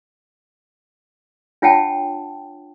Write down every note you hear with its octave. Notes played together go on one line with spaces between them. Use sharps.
D4 F4 C#5 F#5 G5 A5